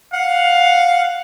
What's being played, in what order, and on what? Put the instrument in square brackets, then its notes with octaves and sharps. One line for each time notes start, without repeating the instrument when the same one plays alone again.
[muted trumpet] F5 [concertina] F#5